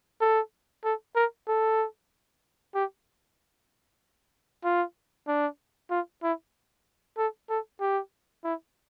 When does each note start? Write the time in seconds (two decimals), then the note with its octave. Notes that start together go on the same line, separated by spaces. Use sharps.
0.21 A4
0.84 A4
1.15 A#4
1.48 A4
2.75 G4
4.64 F4
5.28 D4
5.90 F4
6.23 E4
7.17 A4
7.49 A4
7.80 G4
8.44 E4